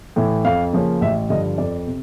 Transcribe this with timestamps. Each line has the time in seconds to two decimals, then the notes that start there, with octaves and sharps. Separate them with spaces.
0.16 A2 E3
0.44 F2 F5
0.73 C#3 F3 A#3 C#4
1.01 A1 E5
1.30 G2 D3 F3 D#5
1.58 F2 D5
1.87 C3